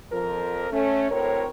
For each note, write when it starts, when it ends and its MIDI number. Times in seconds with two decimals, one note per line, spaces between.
0.11 0.67 41
0.11 0.67 53
0.11 0.67 70
0.71 1.06 57
0.71 1.06 61
1.10 1.48 38
1.10 1.48 45
1.10 1.48 60
1.10 1.48 70
1.10 1.48 73